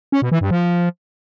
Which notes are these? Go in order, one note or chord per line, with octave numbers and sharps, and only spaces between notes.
C#4
B2
E3
G2
F3